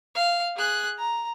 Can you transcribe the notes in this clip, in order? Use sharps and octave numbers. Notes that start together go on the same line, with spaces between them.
F5
G#4 F#6
A#5